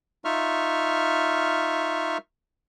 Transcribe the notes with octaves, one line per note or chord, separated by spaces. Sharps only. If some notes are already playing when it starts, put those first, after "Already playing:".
D#4 F4 E5 C#6 F6